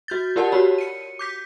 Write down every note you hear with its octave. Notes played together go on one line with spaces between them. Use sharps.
F#4 G6 A6
F4 G4 A#4 D5 F#5 A5
F#4 G4 C#5 B5
C#7 D#7
D6 G6 B6